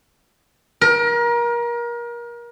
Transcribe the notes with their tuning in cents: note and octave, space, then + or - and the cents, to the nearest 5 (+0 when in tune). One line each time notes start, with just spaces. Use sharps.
A#4 +30